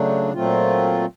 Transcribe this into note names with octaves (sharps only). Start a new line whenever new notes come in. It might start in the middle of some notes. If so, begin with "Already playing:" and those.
Already playing: C#3 F#3 A3 D4
A#2 F#3 A3 C4 F4